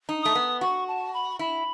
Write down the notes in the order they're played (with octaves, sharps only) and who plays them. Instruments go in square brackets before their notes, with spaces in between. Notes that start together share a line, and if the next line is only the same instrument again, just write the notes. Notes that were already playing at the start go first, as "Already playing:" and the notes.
[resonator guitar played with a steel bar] D#4
[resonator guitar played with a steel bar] A3 [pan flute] D#6
[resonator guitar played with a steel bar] B3
[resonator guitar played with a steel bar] F#4 [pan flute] C#6
[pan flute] A5
B5
[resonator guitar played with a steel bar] E4 [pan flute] B5